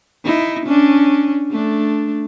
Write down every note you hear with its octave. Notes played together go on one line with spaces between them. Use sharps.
D#4 E4
C#4 D4
A3 D4